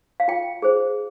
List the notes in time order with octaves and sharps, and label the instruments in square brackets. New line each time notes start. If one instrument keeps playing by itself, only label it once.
[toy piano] F5
F4 G5
G#4 C5